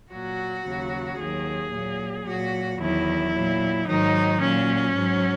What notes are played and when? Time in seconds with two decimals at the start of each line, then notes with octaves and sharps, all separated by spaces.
0.12 A#2 F#3 F#4
0.66 D#2 C#3 F#3
1.19 D#2 D#3 F#3 G#4
1.72 A#2 F#3
2.26 A#2 F#3 F#4
2.79 E2 D#3 F#3 E4
3.33 A#2 F#3
3.87 G#2 D#3 F#3 D#4
4.40 A#2 F#3 C#4
4.94 G#2 F#3